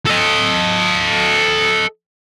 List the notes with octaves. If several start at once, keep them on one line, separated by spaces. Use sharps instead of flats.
A4 D#5